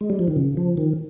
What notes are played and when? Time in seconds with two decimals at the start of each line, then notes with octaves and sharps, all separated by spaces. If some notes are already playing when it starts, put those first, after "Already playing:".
0.01 G#3
0.10 G3
0.19 F3
0.28 D#3
0.36 C#3
0.57 F3
0.77 D#3